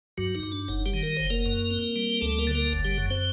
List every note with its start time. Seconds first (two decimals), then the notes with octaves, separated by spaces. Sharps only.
0.17 G2 F#3 F#4
0.35 D#4
0.43 G2
0.52 D4
0.68 F#1 D#4
0.86 G3 G4
0.94 D#3
1.03 A#4
1.17 F#1 C5
1.30 A#3 A#4
1.46 F#2
1.71 C4
1.96 G3
2.21 D2 A3 A4
2.38 A#3 A#4
2.47 D3
2.55 A#3 A#4
2.72 F#1
2.85 G3 G4
2.98 F#2
3.10 C4 C5